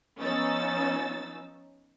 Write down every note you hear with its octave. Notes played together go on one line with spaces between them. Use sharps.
F3 B3 C#4 D#4 E6 A6